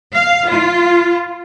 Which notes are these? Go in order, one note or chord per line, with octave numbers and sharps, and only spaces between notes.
F5
F4